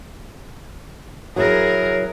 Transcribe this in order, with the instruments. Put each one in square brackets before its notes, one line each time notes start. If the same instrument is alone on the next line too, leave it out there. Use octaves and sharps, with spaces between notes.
[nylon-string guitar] F#3 E4 [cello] G#4 A#4